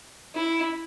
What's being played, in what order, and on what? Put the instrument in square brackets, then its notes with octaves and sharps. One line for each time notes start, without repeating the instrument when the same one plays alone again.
[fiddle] E4